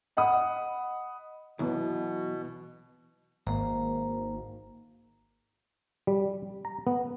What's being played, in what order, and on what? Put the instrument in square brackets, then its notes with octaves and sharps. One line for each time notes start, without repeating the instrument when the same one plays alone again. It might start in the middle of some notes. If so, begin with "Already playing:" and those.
[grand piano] D#5 F#5 B5 D#6
[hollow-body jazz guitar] B1 [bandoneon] B2 [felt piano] E3 B3 B4
[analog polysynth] G#1 [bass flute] A#3 [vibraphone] C5 A#5
[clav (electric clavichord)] G3
A#5
B3